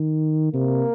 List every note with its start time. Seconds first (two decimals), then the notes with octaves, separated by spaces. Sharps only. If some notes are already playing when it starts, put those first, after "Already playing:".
Already playing: D#3
0.53 C3 A#3